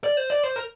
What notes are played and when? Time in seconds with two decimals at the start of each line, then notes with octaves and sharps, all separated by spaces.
0.04 D5
0.17 C5
0.30 D5
0.43 C5
0.56 A#4